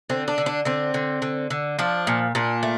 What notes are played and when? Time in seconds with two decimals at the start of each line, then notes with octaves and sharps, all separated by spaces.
0.10 D3 C4
0.28 D4
0.38 D3
0.46 D4
0.65 D3 C4
0.94 D3
1.22 D3
1.50 D3
1.79 F3 D4
2.07 A#2
2.35 A#2 D4
2.63 A3